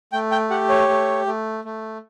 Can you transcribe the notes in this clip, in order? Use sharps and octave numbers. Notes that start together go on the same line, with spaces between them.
A3 G5
G5
G4 F#5
C#5
A3
A3
A3